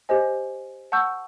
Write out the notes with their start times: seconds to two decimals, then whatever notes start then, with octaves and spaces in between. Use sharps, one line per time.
0.09 G4 C5 D#5 G#5
0.92 F#5 A5 C#6 E6 G6